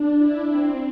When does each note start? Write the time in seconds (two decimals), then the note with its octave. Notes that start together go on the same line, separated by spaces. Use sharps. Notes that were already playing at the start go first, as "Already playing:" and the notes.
Already playing: D4
0.18 E4
0.49 C4